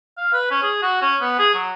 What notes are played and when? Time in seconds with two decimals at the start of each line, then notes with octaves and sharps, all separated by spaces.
0.18 F5
0.33 B4
0.51 C#4
0.63 G#4
0.82 F#4
1.02 C#4
1.21 B3
1.39 G#4
1.54 F#3